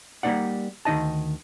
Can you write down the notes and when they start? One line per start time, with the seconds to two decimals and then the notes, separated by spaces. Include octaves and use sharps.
0.23 G3 A#3 C4 D#4 D5 F#5
0.85 D2 D#3 D#4 D#5 A5